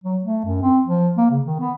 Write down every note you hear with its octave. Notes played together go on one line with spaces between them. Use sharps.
F#3
A3
F#2
C4
F3
A#3
C#3
D#3
B3